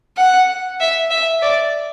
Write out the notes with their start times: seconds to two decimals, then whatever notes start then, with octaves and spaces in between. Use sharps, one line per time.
0.17 F#5
0.80 E5
1.10 E5
1.42 D5